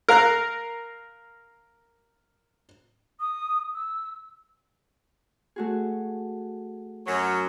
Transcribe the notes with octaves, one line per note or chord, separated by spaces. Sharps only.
A#4 F5 A#5 F#6
D#6
E6
A3 F#4 G#4
F#2 F#3